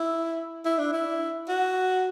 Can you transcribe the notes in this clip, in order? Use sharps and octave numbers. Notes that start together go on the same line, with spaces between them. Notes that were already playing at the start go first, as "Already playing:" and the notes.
Already playing: E4
E4
D4
E4
F#4